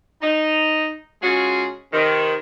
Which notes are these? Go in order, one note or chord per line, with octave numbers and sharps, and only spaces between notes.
D#4
C#3 G#3 F4 F#4 G#4
C3 D#3